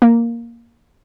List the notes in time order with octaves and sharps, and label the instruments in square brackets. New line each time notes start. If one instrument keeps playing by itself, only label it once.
[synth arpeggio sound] A#3